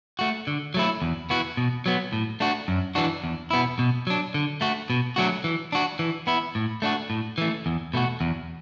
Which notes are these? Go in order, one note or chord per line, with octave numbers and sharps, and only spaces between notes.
A3 F#4
D3
F#3 A3 E4
E2
E3 B3 F#4
B2
F#3 B3
A2
A3 D4 F#4
F#2
E3 D4 F#4
E2
B2 B3 E4
B2
F#3 D4
D3
A3 F#4
B2
F#3 A3 D4 F#4
E3
D4 F#4
E3
B3 E4
A2
A3 D4 F#4
A2
E3 A3
E2
B2 A3 F#4
E2